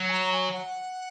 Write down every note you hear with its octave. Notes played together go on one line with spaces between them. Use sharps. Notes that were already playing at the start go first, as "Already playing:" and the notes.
Already playing: F#3
G#5
A#5
G#5
F#5